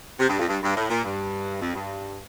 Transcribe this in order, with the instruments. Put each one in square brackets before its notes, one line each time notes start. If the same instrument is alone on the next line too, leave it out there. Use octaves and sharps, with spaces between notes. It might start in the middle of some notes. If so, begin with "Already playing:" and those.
[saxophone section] C3
G2
F2
G2
G2
A2
A#2
G2
F2
G2